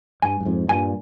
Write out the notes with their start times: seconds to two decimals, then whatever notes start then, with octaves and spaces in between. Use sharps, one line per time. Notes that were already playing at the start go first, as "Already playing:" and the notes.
0.22 G2 G#5
0.41 G2
0.45 F2 G#2
0.68 G2 A#2 G#5